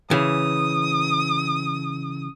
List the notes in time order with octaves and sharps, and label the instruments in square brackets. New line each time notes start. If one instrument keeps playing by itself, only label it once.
[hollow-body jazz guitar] C#3 E3 [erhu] D#6